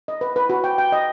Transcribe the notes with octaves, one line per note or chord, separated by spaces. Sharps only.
D#5
B4
B4
F#4
G5
G5
D#5